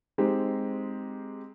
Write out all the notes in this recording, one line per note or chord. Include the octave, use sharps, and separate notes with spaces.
G#3 C4 D#4 G4